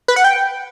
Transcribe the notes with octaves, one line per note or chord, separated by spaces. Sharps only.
B4
F#5
G5